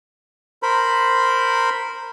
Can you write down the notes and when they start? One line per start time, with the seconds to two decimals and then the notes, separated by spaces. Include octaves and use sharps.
0.63 A#4 C5 B5